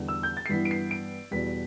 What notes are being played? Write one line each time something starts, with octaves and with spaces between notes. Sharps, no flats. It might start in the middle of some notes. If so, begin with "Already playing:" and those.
Already playing: E2 D3 G3
E6
G6
A6
C7
G2 E3 B3 E4 B6
D7
C7
D7
E2 B2 G3 B6